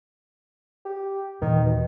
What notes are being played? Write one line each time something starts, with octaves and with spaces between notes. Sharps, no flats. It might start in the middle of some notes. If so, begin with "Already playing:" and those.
G4
D#2 A#2 D#3 E3
B2